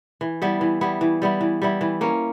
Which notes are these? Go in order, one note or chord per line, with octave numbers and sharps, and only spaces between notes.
E3
G3 B3 E4
E3
G3 B3 E4
E3
G3 B3 E4
E3
G3 B3 E4
E3
A#3 C#4